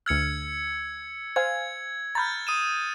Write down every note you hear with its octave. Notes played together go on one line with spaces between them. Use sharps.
D2 E6 F6 G#6 C#7
C5 F5 G#5 G#6
A#5 B5 F6 G6 A6
D#6 D#7 E7